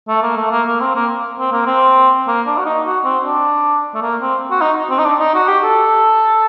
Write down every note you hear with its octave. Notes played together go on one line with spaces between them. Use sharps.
A3
A#3
A3
A#3
A#3
C4
A#3
C4
A#3
C4
A#3
D4
F#4
D#4
F#4
C4
D4
A3
A#3
C4
F#4
D#4
C4
D#4
D4
D#4
F#4
G4
A4